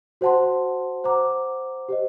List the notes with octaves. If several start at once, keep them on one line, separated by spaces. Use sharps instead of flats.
F#4 C5 F#5 A5 C6
C5 F#5 A#5 D6
G4 C5 D#5